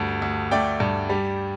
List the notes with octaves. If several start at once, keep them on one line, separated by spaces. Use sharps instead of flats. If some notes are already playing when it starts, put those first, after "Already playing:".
Already playing: D2 G2
D2
A3 D5 G5
G2
G3